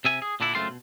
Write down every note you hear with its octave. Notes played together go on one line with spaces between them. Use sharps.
C3 E5 G#5
G#4
A#2 D3 D4 E4
C#2 F#2 A3 C4 F4 C6
B2